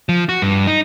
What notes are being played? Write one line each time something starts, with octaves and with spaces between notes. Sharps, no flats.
F3
F#4
G2
D#4